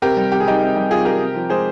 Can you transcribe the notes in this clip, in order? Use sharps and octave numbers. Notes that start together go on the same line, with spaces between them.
C3 G4 A#4
G3
C3 G4
G#4
G3 D#4 G4
C3
G3
C3 F4 G#4
G3 G4 A#4
C3
F3
G#3 G#4 C5